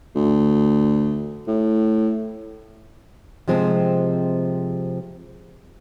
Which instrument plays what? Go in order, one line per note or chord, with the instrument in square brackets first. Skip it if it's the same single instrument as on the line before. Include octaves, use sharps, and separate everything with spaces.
[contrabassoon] D2
A2
[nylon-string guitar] C3 F3 G#3 C4